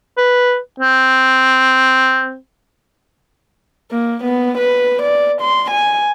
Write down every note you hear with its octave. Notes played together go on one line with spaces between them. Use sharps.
B4
C4
A#3
B3
B4
D5
C6
G#5